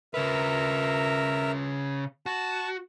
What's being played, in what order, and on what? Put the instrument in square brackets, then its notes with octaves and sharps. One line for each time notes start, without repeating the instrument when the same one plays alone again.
[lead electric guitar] C#3 B4 [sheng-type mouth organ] A#4 E5 A#5
[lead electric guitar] F#4 [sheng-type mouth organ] A5